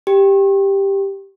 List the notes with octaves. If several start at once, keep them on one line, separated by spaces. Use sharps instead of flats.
G4